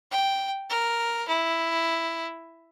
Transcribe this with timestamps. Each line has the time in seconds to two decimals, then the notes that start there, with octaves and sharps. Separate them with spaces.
0.11 G5
0.70 A#4
1.28 E4